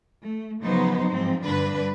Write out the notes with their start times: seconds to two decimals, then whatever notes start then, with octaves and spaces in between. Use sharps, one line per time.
0.23 A3
0.62 C#3 F3 F#3 B3 D#4 C5
1.10 G#2 F3 C4
1.45 G2 D3 D4 B4